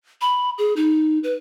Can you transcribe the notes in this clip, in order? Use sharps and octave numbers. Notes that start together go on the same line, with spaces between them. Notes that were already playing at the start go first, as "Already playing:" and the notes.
B5
G#4
D#4
B4